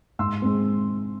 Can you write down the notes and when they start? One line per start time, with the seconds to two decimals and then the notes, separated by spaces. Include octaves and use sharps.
0.19 G#2 C6 E6
0.42 G#3 C4